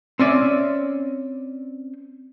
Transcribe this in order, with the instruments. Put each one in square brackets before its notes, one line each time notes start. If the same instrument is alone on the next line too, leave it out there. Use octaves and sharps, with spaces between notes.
[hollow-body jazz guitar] C4 C#4 D5 E5